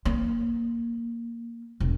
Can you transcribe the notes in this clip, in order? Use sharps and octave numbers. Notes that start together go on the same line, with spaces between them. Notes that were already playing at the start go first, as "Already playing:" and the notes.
A#3
E1